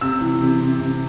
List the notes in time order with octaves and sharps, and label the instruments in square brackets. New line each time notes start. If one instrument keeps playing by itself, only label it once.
[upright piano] C3 E6
E3
C3
C3
C3